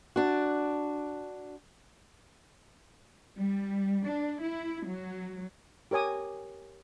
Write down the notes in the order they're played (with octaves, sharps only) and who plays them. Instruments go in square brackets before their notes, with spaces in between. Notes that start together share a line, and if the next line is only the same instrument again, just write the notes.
[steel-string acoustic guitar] D4 F#4
[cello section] G3
D4
E4
F#3
[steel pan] G4 A#4 C#5 G#5 D#6